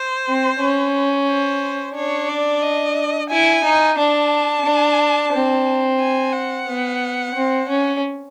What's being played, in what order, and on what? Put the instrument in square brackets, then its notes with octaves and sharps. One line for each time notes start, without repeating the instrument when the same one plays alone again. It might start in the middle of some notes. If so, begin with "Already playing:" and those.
Already playing: [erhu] C5
[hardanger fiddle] C4
C#4
[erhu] C5
[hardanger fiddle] D4 [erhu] C#5
[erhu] D5
D#5
[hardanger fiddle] E4 [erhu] G#5
[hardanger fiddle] D#4
[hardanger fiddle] D4 [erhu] A5
[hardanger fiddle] D4
C4
[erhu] G#5
F#5
[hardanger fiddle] B3
C4
C#4